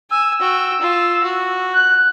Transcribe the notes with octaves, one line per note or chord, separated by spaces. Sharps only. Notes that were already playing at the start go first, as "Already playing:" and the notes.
G#5 E6
F#4 G5
F4
F#4
F#6